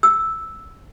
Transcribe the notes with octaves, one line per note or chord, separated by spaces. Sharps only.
E6